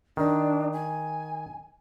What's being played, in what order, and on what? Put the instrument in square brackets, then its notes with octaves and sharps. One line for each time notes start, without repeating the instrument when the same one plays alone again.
[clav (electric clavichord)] D#3 [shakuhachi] D4
[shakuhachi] G#5